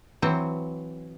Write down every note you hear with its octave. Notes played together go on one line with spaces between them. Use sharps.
E3 F#3 C4